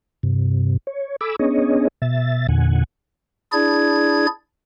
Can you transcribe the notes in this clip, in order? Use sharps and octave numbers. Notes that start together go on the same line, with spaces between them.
G2 C3
C#5
A4 G#5 B5 D6 E6
B3 C#4 D4 G#4 C#5 D#5
B2 E5 A6
E2 A#2 D3 F#5 G#5
D4 E4 G#4 D5 G#6